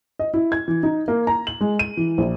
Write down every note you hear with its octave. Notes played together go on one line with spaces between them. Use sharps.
D#5
E4
G#6
E3
D#4
A#3
A#5
F#7
G#3
D#7
E3
A#1